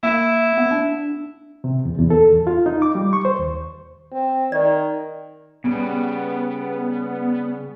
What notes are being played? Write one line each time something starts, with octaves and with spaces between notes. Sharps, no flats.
A#3 E4
B3
D4
C3
E2
E2
A4
E2
F4
D#4
D6
G3
C#6
C5
D#2
C4
D#3 D5
C#3 G3 B3